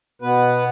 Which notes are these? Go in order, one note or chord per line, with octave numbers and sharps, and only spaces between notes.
B2 B3 B4